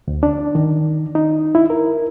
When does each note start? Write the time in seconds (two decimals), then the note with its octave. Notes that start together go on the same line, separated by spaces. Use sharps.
0.08 D2
0.23 D4
0.55 D#3
1.15 D#4
1.55 E4
1.70 A#4